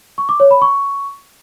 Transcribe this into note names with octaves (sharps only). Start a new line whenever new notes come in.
C#6
D6
C#5
B5
C#6